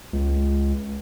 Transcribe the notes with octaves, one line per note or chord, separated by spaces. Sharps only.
C#2